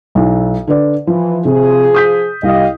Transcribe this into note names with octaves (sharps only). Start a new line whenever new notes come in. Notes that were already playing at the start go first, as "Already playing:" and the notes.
B1 E4
D3 B4 D5
E3 F3
C3 F3 G#4
D#6 G6 B6
C2 G4 D#5 F5